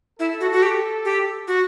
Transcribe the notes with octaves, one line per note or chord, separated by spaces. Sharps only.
E4 A4
F#4
F#4
G4
G4
F#4